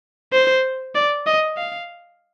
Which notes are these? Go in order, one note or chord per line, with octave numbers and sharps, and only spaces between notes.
C5
D5
D#5
F5